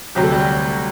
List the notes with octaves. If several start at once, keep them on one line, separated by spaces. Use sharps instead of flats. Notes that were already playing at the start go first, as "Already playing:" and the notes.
D2 C3 F#3 G4
A4
G3 G4